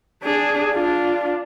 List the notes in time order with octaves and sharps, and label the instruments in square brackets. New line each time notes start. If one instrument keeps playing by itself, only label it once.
[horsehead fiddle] D4 G#4
D4 F4